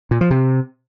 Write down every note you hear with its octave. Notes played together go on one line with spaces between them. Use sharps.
A#2
F3
C3